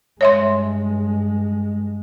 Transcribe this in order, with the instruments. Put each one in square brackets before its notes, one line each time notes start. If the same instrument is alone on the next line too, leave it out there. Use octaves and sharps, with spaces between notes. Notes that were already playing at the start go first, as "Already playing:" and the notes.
[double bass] G2 G#3 [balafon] C#5 E5 C6